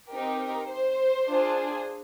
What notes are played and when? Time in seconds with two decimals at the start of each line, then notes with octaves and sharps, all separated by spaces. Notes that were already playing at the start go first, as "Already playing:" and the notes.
0.12 C4 D#4 G4 A#4
0.41 A#4
0.70 C5
1.29 D4 F4 G#4